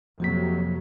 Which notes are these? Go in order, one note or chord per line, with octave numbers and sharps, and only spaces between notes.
F2 C3 F3 F#3 A#3 B6